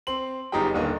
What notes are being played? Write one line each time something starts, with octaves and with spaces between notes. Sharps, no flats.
C4 C6 F#7
G1 F#2 D#4 G4 G#4 G5
D#1 D3 D#3 A#3 D#5